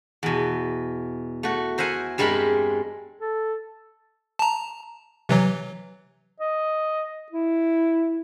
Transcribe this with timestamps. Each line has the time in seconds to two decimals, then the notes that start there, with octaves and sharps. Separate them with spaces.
0.23 E2 B2
1.43 A3 F#4
1.78 A#4 C5 E5 F#5 G#5
2.18 G2 G3 G#3 C4 A#4 B5
3.21 A4
4.39 A5 A#5
5.29 C3 E3 F#3
6.40 D#5
7.32 E4